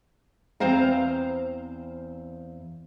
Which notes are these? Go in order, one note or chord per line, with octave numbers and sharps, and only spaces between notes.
E2 C4 C5 F5 A#5